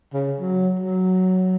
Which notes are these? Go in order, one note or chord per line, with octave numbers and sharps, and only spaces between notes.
C#3
F#3
F#3